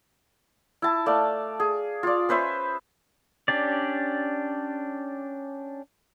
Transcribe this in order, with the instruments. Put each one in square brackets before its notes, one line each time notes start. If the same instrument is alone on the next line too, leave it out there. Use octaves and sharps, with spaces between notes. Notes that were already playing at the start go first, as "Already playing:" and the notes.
[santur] E4 A5
A3 D5 F5
G#4
F4 D5
C#4 B4 C5 E5
[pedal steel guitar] C#4 D4 G4 D5